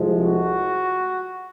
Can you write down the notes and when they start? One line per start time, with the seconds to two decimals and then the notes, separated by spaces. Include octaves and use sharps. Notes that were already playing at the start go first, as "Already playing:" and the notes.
Already playing: C2 C3 F3 G#3
0.24 F#4